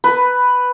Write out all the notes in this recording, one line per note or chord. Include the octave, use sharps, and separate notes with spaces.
B4